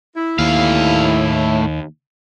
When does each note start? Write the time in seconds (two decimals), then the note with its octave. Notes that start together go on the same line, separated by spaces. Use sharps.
0.16 E4
0.39 D#2 A2 F5